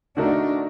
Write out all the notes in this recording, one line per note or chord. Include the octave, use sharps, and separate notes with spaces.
D3 A3 D4 D#4 F#4 A#4